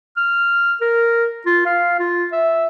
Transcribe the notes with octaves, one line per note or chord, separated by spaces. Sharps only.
F6
A#4
F4
F5
F4
E5